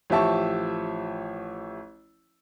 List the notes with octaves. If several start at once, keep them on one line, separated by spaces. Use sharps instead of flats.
A1 F3 G4 E5 A5 C#6